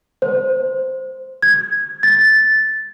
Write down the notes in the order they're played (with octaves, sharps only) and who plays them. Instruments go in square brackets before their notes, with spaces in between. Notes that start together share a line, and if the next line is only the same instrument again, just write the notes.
[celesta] C5
G#6
A6